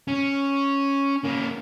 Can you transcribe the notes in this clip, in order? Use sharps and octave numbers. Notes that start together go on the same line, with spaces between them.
C#4
A#3 C#4